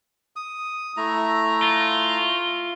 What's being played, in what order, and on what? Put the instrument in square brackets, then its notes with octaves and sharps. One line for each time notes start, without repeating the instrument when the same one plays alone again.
[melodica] D#6
A3 E4 A#5
[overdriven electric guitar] F4